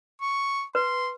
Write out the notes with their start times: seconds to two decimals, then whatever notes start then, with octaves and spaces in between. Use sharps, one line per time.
0.21 C#6
0.75 B4 C6